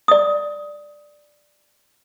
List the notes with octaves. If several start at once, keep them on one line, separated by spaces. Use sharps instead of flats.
D5 D#6